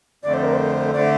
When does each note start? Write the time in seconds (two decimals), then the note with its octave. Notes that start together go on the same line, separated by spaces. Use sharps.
0.23 F2 D3 A3 D5
0.34 C5
0.43 A#4
0.54 C5
0.94 D3 A3 D5